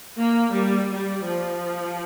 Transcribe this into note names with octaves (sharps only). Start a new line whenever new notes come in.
A#3
G3
G3
F3